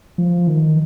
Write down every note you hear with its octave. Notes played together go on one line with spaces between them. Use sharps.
F3
D#3